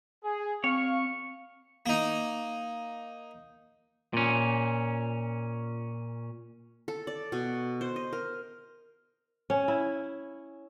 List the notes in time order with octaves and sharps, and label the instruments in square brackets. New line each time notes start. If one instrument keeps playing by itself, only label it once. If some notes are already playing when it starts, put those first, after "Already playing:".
[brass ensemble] G#4
[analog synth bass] C4 [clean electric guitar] C#5 [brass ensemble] F5 [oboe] C#6
[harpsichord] A#3 D#4
[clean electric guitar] A#2 C#4
[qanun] A4
D5
B2
C5
D#5
A#4
[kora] C#4
E4